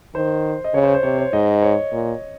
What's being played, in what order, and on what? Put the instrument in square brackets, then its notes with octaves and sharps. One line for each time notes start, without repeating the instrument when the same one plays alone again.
[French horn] D#3 [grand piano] C5
[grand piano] D#5
[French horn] C#3 [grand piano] C#5
[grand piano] C5
C5
[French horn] C3 [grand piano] C#5
[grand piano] C#5
[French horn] G#2 [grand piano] D#5
[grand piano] C#5
[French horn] A#2